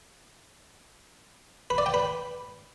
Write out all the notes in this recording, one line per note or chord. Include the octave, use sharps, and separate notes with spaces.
B4
D5
G5
B4